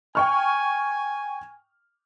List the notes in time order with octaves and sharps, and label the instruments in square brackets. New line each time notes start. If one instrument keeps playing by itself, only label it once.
[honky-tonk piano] G5 C#6 F6 [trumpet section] G#5